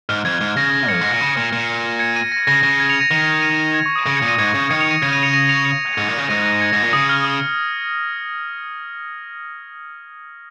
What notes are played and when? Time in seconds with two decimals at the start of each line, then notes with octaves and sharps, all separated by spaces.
0.09 G#2 F6
0.25 F2 G#6
0.41 G#2
0.57 C#3 A#6
0.89 F2 G#6 C#7
1.01 G#2 A#6
1.11 A#2
1.21 C#3
1.37 A#2
1.53 A#2
1.99 G#6 C#7
2.16 A#6 D#7
2.32 A#6
2.47 C#3 A#6
2.63 C#3 A#6
2.80 G#6
2.89 C#7 F7
3.00 A#6 D#7
3.11 D#3 C#7 F7
3.42 A#6 D#7
3.54 A#6
3.65 A#6
3.74 G#6
3.86 C#6
3.96 D#6
4.06 C#3 A#6
4.17 G#6 C#7
4.22 A#2
4.28 A#6 D#7
4.38 G#2 G#6 C#7
4.54 C#3
4.70 D#3 G#6 C#7
4.80 C#7 F7
4.91 A#6 D#7
5.02 C#3 G#6 C#7
5.13 A#6 D#7
5.23 C#7 F7
5.33 A#6 D#7
5.49 C#7 F7
5.65 C#7 F7
5.98 G#2
6.09 A#2
6.18 C#3
6.29 G#2 A#6 D#7
6.45 A#6 D#7
6.60 G#6 C#7
6.71 G#2 A#6
6.82 A#2
6.93 C#3 D#6
7.09 F6
7.25 D#6